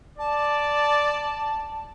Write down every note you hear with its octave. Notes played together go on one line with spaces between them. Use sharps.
D5 A5